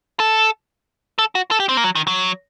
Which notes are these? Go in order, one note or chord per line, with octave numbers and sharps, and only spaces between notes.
A4
A4
F#4
A4
G4
C4
A#3
F#3
D#3
F#3